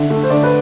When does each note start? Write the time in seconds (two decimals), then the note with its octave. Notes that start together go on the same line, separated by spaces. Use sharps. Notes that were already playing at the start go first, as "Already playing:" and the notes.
Already playing: D3 E5
0.10 A3
0.23 C5
0.30 D3 D5
0.43 B4